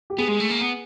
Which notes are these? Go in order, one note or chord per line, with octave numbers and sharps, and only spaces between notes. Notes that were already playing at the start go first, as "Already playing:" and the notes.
G4
B3 G#4
G#3
A3
A#3
B3